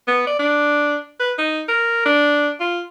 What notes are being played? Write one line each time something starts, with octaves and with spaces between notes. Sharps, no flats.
B3
D5
D4
B4
D#4
A#4
D4
F4